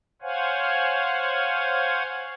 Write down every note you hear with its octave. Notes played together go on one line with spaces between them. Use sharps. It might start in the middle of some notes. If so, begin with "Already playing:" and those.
C5 C#5 F5 F#5 G#5